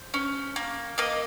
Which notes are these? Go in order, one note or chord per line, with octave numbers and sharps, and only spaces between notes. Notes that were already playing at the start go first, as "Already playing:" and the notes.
Already playing: C5
C#4
A#3
A#3 D#5